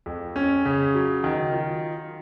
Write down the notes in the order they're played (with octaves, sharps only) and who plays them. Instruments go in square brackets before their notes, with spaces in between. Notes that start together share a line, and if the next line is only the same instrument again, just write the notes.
[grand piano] F2
C#4
C#3
F#3
D#3
F4